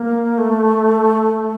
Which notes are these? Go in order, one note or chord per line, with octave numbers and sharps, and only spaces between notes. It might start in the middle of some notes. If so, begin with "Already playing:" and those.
Already playing: A#3
A3